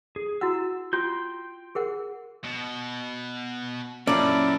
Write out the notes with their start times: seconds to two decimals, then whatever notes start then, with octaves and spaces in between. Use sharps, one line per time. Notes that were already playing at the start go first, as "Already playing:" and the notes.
0.16 G#4
0.41 E4 F#4 F#5 E6
0.93 F4 G5 C6 G6
1.75 G#4 A#4 F#5
2.44 B2
4.07 F#2 A#2 C#4 E4 A#4 D5 A5